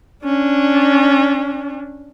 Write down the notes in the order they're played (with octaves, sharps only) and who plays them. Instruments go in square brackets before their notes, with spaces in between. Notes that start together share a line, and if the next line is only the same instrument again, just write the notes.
[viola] C#4 D4